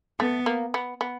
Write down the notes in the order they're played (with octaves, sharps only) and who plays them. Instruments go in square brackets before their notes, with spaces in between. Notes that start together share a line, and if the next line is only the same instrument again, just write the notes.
[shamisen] A3 [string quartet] B3
[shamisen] A#3
B3
B3